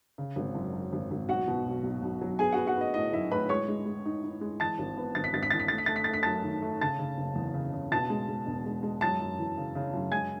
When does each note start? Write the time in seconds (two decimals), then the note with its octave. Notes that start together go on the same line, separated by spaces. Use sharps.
0.18 C#3
0.36 G#1
0.55 F#2
0.73 F#2
0.93 G#1
1.11 G#1
1.29 B1 F#4 F#5
1.48 B2
1.66 B1
1.83 B1
2.02 B1
2.21 F#3
2.39 B3 G#4 G#5
2.52 F#4 F#5
2.58 B3
2.66 F#4 F#5
2.76 B3 D#5
2.94 A2 D#5
3.12 F#3 E4 E5
3.31 A2 B4 B5
3.49 G#3 C#5 C#6
3.68 G#3
3.86 G#3
4.05 D#4
4.24 D#4
4.41 G#3
4.60 E3 A5 A6
4.79 G#1
4.97 B3
5.15 G#1 A6
5.24 B6
5.33 G#1 A6
5.43 B6
5.51 E3 A6
5.59 B6
5.68 A3 A6
5.78 B6
5.86 A3 A6
5.96 B6
6.04 A3 A6
6.14 B6
6.23 F#2 A5 A6
6.44 D#3
6.62 A3
6.81 C#3 A5 A6
6.99 C#3
7.18 F#1
7.36 E2
7.54 C#3
7.72 C#3
7.91 B2 A5 A6
8.10 G#3
8.29 G#3
8.46 E1
8.65 G#3
8.83 G#3
9.01 F#2 A5 A6
9.20 F#2
9.39 E3
9.58 C#3
9.75 C#3
9.93 F#2
10.12 G#3 G#5 G#6